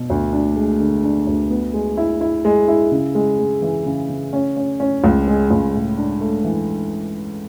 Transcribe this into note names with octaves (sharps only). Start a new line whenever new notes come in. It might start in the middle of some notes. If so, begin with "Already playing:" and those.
Already playing: B2
D2
D4
G#3
D3
D4
D2
B3
G#3
E4
E4
G#3
E4
C#3
G#3
G#3
E3
C#3
C#3
C#4
C#4
C#4
C#2
G#3
C#2
A2
D4
A3
E3